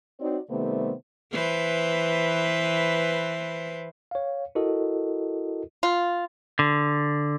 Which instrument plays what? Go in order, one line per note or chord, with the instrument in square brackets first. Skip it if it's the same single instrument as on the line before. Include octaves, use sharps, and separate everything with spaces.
[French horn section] C4 D#4 F#4 C#5 D5
C3 D#3 G3 A3 B3 C5
[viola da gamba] E3 B4 C5
[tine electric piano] C#5 F5
E4 F#4 A4 A#4 D#5
[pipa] F4
[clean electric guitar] D3